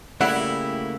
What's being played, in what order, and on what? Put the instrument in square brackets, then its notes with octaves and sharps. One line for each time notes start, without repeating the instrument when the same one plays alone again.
[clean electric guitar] C#3 A3 A#3 [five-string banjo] G3 F#5 [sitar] E4